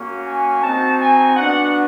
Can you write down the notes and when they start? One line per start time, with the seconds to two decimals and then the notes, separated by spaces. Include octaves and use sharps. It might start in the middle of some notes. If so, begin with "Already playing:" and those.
Already playing: A#3 C#4 F#4
0.26 G#5
0.62 C4 D#4 F#4 A5
0.99 G#5
1.36 B3 D4 F#4 F#5